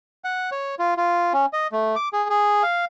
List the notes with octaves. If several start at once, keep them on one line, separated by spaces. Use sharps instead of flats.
F#5
C#5
F4
F4
C#4
D#5
A3
D6
G#4
G#4
F5